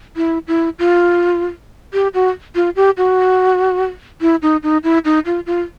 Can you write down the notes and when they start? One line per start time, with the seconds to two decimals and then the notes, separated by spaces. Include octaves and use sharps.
0.17 E4
0.48 E4
0.79 F4
1.93 G4
2.14 F#4
2.55 F4
2.76 G4
2.97 F#4
4.21 E4
4.42 D#4
4.63 D#4
4.84 E4
5.05 D#4
5.26 F4
5.46 F4